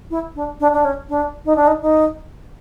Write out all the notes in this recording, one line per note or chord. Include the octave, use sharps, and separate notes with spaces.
E4
D4
D4
D4
C#4
D4
D#4
D4
D#4
D#4